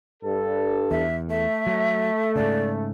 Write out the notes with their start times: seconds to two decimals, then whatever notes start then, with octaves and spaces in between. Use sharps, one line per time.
0.23 G2 A4
0.91 E2 E5
1.30 A3 E5
1.67 F#3
2.35 G#2 C#3 D5